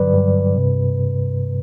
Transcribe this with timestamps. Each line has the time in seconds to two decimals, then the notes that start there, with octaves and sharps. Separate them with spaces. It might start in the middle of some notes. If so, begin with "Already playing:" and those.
Already playing: G2 D3 F#3 B4 D5
0.14 G2
0.56 C3